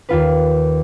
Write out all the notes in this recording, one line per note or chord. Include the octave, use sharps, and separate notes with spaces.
D#2 F4 B4